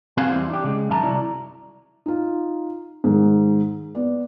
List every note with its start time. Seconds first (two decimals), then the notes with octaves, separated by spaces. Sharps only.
0.17 B3 C4 F#4 G#4 F5 G#5
0.30 E2 G3 E4 C5
0.50 D4 G4
0.64 C#3 G#3
0.89 F#2 D#3 E5 A5 A#5
1.03 C2 E4 F#4 D5 A#5
2.06 D#4 F4
3.04 G#2 D#3 G#3
3.95 B3 D5